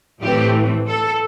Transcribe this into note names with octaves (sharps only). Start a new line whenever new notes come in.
A2 E3 A3 C4 G4
A4